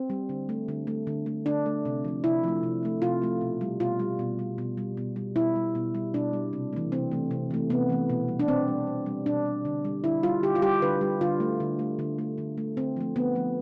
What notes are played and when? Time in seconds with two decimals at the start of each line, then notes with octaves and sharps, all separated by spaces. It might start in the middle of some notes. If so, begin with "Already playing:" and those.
Already playing: C4
0.10 G3
0.29 D3
0.49 A3
0.68 D3
0.87 A3
1.07 D3
1.26 A3
1.46 D3 D4
1.66 A3
1.85 C3
2.04 F3 A3
2.24 C3 E4
2.43 F3 A3
2.63 C3
2.83 F3 A3
3.02 C3 F4
3.22 F3 A3
3.41 B2
3.61 G3
3.80 B2 F4
3.99 G3
4.19 B2
4.39 G3
4.58 B2
4.77 G3
4.97 B2
5.16 G3
5.36 B2 E4
5.56 G3
5.75 B2
5.95 G3
6.14 B2 D4
6.33 G3
6.53 C3
6.73 E3 A3
6.92 C3 C4
7.12 E3 A3
7.31 C3
7.51 E3 A3
7.70 C3 B3
7.89 E3 A3
8.09 B2
8.28 G3
8.40 D4
8.48 B2 C4
8.68 G3
8.87 B2
9.06 G3
9.26 B2 D4
9.46 G3
9.65 D3
9.85 G3
10.04 D3 E4
10.23 G3 F4
10.43 D3 G4
10.55 F4
10.62 G3 G4
10.82 D3 B4
11.01 G3
11.21 D3 F4
11.40 A3
11.60 D3
11.79 A3
11.99 D3
12.18 A3
12.38 D3
12.58 A3
12.77 D3 C4
12.96 F3 A3
13.16 D3 B3
13.35 F3 A3